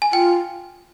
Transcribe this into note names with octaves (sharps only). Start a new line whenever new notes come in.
G#5
F4 G5